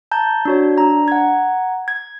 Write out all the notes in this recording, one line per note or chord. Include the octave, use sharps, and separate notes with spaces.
A5 A#5 G6
D4 F#4 C#5
D4 A#5
F#5 A#5 G#6
G#6